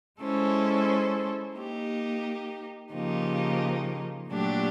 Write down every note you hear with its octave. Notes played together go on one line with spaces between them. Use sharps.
G#3 C#4 E4 A4 C5
A#3 D#4 G4
C#3 F3 A#3 D#4 G4
A#2 F#3 A3 D4 G4